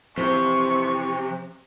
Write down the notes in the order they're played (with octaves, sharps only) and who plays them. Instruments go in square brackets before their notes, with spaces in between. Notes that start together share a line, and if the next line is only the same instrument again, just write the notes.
[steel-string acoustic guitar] F2 E3 C5 [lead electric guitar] C3 [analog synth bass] F3 [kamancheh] C#6